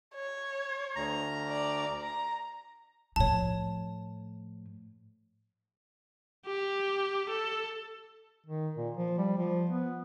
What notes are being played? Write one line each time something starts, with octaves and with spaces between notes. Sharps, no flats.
C#5
D2 A#5
D5
A#5
A2 F3 C#5 A5
G4
A4
D#3
A#2
F3
G3
F3
B3